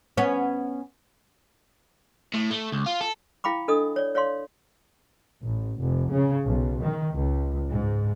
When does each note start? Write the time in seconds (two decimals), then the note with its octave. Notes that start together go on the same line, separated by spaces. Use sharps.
0.17 B3 C#4
2.34 A2
2.51 A3
2.72 C#2
2.86 F4
3.01 A4
3.44 E4 F5 G5 B5 D6
3.68 D4 A4 D#5 D#6
3.96 C#5 D5
4.15 C#5 D5 F5 C6
5.42 A1
5.80 F1
6.11 C#3
6.47 B1
6.82 D#3
7.17 C#2
7.70 G#2